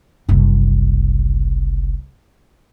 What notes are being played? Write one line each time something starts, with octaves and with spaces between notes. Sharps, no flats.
F#1 C2